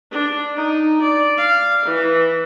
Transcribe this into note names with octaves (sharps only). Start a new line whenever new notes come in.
D4
D#4
D5
F5
E3